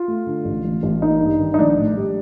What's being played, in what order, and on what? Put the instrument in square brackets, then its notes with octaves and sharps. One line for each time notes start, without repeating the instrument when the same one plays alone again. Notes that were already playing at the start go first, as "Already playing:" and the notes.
Already playing: [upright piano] F4
A3
D3
A1
A1
A1
A#3 D#4
G2
D#3
D#4
A#1 D4
A2
G3